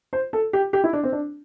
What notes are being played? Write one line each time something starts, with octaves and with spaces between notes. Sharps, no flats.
C5
A4
G4
G4
E4
D4
C4
D4